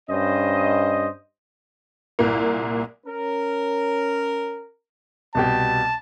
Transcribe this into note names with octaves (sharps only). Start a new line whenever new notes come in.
G2 C#4 C5 D#5
C2 A#2 A#3
C#4 A#4
C2 B2 G4 A5